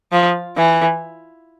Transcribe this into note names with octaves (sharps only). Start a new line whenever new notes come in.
F3
E3